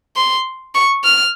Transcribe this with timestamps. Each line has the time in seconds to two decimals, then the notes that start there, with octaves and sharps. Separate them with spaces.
0.16 C6
0.75 C#6
1.04 F6